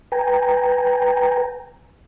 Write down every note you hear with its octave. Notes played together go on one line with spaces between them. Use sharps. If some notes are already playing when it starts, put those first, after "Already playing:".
B4 G5 G#5 A#5